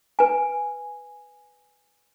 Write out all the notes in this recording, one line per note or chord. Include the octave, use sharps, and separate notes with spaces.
B4 G#5